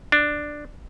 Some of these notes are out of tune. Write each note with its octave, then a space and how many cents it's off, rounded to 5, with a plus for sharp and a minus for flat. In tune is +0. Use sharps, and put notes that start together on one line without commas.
D4 +5